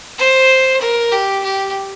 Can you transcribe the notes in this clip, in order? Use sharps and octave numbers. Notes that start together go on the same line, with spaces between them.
C5
A#4
G4
G4